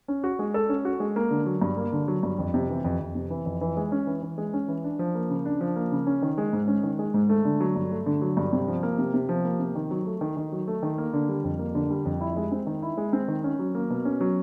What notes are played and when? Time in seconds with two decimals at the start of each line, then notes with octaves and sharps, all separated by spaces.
0.08 C#4
0.24 F#4
0.39 G#3
0.54 A4
0.69 C#4
0.85 F#4
1.00 G#3
1.16 A#3
1.31 D3
1.46 F#3
1.62 G2
1.77 A#3
1.92 D3
2.08 F#3
2.23 G2
2.39 F2
2.54 C3
2.69 E3
2.84 F2
3.00 F2
3.15 C3
3.30 E3
3.46 F2
3.61 E3
3.77 G#3
3.92 C#4
4.07 E3
4.23 E3
4.38 G#3
4.54 C#4
4.68 E3
4.84 D4
4.99 F3
5.15 A#3
5.30 C#3
5.45 D4
5.61 F3
5.76 A#3
5.92 C#3
6.07 C#4
6.22 D#3
6.38 G#3
6.53 G#2
6.68 C#4
6.83 D#3
6.99 G#3
7.14 G#2
7.29 A3
7.45 D3
7.60 F#3
7.76 G2
7.91 A3
8.06 D3
8.22 F#3
8.37 G2
8.52 C3
8.68 F3
8.83 A#3
8.98 C3
9.14 C3
9.29 F3
9.44 A#3
9.60 C3
9.75 D#3
9.91 F#3
10.06 A3
10.21 D#3
10.37 D#3
10.52 F#3
10.68 A3
10.83 D#3
10.98 A#3
11.14 D3
11.29 G3
11.44 F2
11.59 A#3
11.75 D3
11.90 G3
12.05 F2
12.21 E4
12.36 G#3
12.52 C4
12.67 D#3
12.82 E4
12.97 G#3
13.13 C4
13.28 D#3
13.44 C#4
13.59 F#3
13.75 A#3
13.90 B2
14.05 C#4
14.21 F#3